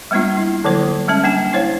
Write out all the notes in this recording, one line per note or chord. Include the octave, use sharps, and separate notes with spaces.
G3 G#3 A#3 B3 D4 F4
E4
D3 F3 F#3 A#3 E4 C5
G3 G#3 C#4 A5
A#3 D4 G#5
E4 C5 C#5 F5